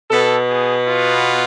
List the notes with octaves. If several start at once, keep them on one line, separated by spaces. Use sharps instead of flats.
B2 B3 A4
G#4
F4